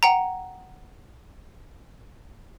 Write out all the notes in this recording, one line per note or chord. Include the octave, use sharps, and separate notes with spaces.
F#5 G5 A#5